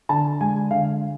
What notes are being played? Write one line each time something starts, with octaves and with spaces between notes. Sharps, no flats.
D3 A5
G#3 G#5
D3 F5